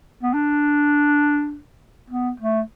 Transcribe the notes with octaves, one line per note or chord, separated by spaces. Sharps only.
B3
D4
B3
A3